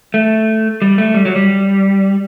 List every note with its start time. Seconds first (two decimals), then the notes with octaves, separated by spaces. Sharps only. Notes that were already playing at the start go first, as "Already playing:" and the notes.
0.14 A3
0.82 G3
0.98 A3
1.14 G3
1.25 F#3
1.36 G3